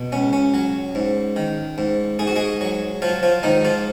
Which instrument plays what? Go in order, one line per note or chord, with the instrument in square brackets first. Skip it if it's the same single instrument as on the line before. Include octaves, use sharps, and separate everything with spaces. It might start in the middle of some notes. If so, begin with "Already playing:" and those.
Already playing: [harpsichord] B2
C#2 C#4
C#4
F#3
G#2
D#3
G#2
G#2 G#4
F#4
G#3 G#4
F#3
F3 F#3 F4
F3 F4
G#2 D#3 D#4
F3 F4